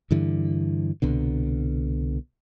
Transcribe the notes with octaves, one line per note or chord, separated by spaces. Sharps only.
G2 D3 E3
C2 B2 D3